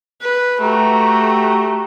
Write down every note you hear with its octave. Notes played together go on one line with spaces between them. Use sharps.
B4
A3 F#4 G4 A#5